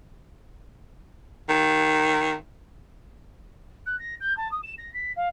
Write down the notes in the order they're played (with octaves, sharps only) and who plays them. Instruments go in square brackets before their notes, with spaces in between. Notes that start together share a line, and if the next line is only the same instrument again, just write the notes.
[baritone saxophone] D#3
[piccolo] F#6
A#6
G6
A5
D#6
E7
A#6
B6
F5